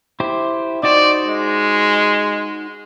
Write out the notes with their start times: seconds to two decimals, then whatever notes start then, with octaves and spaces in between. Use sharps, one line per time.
0.20 E4 G4 C5
0.83 D#4 F#4 C5 D5
1.27 G#3